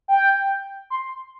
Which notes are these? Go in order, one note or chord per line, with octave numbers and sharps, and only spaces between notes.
G5
C6